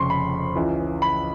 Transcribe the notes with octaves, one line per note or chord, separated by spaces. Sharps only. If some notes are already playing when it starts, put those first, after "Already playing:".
Already playing: F1 F2 C#3 C6 C#6
B5
C#2 C#3 E3
B5